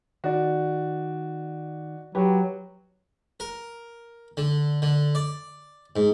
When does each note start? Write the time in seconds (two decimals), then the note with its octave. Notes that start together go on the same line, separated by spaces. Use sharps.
0.24 D#3 D#4 F#4 D5
2.15 F#3 F#4 G4 B4
3.40 A#4
4.37 D3
4.82 D3
5.15 D5
5.96 G#2